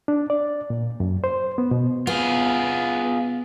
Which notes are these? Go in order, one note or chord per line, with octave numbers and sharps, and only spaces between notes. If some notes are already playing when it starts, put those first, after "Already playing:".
D4
D5
A#2
F#2
C5
B3
B2
B3 F4 G#4